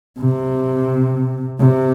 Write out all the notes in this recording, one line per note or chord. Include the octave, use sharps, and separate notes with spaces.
C3
C3